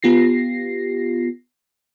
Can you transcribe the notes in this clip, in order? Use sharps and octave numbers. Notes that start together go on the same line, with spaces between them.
B3 F4 G4 A#6 C7